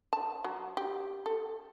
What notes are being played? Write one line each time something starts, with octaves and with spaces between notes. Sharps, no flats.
A5
F#3
G4
A4